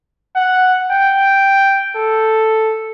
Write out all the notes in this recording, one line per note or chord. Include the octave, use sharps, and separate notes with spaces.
F#5
G5
A4